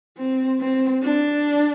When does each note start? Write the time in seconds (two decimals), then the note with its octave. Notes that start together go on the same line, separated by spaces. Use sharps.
0.17 C4
0.60 C4
1.03 D4